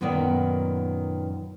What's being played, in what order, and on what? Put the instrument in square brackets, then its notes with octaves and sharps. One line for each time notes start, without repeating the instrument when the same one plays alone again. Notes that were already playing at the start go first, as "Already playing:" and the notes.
[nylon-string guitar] F#2 A#2 D#3 B3 D5